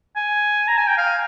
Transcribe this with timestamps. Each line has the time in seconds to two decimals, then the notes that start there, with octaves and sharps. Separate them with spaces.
0.16 G#5
0.68 A#5
0.77 G#5
0.87 G5
0.97 F5